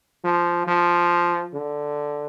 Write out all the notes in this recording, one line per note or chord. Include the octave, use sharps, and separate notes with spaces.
F3
F3
D3